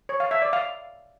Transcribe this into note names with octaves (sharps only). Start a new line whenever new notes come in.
C#5
F5
E5
D5
F5